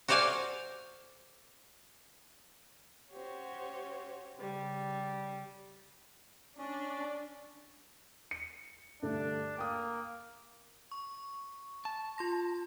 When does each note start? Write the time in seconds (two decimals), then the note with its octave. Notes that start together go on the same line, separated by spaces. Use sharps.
0.08 F#4 A4 C5 D5 F5 G#5
3.12 C#4 F#4 G4 C5 C#5
4.39 C#3 G3
6.59 C#4 D4 D5
8.31 C#7
9.02 G2 D3 A3 D4
9.58 A#3 G5 D#6
10.91 C#6
11.85 A5
12.18 F4 C6 A#6